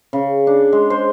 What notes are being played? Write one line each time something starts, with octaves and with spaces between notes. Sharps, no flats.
C#3
D4
G#3
C5